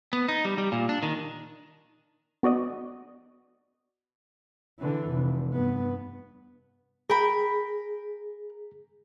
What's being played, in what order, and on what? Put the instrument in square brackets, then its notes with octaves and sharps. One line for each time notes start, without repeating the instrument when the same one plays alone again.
[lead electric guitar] B3
D#4
G3
G3
A#2
D4
D#3
[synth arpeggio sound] B3 F#4 D5 D#5
[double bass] D3 E3
F1
G2 B3
[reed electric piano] G#4 [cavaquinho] A#4 G5 B5